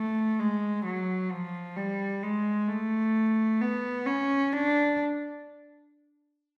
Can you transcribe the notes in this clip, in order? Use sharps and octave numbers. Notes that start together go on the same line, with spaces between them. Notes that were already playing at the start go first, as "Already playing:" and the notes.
Already playing: A3
G#3
F#3
F3
G3
G#3
A3
B3
C#4
D4